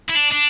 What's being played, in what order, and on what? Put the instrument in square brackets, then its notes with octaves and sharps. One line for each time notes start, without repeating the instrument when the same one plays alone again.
[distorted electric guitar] E4
D4
D4